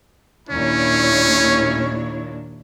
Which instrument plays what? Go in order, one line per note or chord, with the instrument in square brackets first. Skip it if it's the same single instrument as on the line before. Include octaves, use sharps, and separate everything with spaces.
[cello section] D#2 A#2 D4 [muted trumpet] C#4 [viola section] E4 C#5